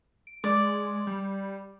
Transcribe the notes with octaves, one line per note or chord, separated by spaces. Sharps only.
D7
G#3 D5
G3